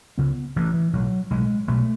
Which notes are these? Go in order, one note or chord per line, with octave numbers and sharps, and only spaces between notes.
C#2 C#3 B3
A1 A2 E3
E3
B1 A2 F#3
B1 A2 G#3
B1 B2 A3